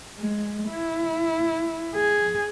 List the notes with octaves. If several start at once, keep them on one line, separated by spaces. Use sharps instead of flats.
G#3
E4
G#4